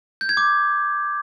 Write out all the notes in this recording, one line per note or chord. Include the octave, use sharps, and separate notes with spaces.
G6
G#6
D6